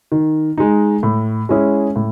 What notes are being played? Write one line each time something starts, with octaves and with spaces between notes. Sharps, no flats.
D#3
G#3 D#4
A2
G#3 C#4 E4 G#4
A2